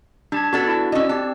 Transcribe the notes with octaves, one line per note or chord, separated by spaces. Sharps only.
G3 D4 A5 G#6
B3 D4 F#4 A4
E4 F#4
C#4 D5 D#5 E6
C4 G4 A5